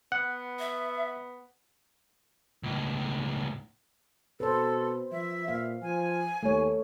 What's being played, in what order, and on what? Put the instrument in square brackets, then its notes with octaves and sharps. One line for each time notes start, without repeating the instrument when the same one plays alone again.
[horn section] B3 [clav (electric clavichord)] F#5
[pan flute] E5
[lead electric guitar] C#2 A2
[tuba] B2 [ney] A4 [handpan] B4 C5
[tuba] F3 [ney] E5
[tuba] A#2 [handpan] F5
[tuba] F3 [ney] G#5
[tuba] D#2 [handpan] A3 C#5